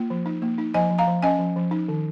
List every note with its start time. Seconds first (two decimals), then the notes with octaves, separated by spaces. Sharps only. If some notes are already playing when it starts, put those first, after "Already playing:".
Already playing: A#3 F4
0.10 F3
0.26 D#4
0.42 A#3
0.58 D#4
0.74 F3 D#5 G#5
0.90 F3
0.98 F5 A#5
1.07 F3
1.22 C#4 D#5 G#5
1.39 F3
1.56 F3
1.71 D#4
1.88 D#3